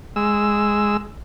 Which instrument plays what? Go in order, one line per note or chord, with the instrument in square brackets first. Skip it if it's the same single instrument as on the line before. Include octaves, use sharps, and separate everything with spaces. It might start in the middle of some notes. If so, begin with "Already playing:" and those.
[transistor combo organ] G#3 E6